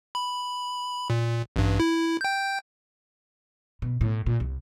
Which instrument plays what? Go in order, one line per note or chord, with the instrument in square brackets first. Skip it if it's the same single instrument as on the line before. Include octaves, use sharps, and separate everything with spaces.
[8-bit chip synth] B5
A#2
A1 G2
E4
G5 G6
[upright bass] B2
A2
A#2
C2